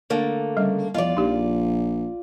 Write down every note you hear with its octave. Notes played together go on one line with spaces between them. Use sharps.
D3 A3 A#3
C#3 G3 D#5
E2 F3 F4 D5 D#5
A#1 D#4 G4